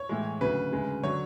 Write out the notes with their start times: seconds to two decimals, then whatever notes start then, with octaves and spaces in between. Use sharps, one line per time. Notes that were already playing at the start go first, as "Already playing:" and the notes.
Already playing: C#5
0.09 A2 E3 G#3
0.41 D2 C#3 F#3 B4
0.72 D2 C#3 G#3
1.03 D3 F#3 C#5